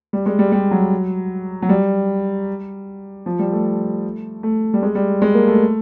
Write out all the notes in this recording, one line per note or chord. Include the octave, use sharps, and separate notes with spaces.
G3
G#3
G3
G3
F#3
F#3
G3
F3
G3
A3
A3
G3
G#3
G3
G#3
A#3
A3